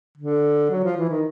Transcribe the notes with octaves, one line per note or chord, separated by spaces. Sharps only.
D3
F#3
F3
E3
D#3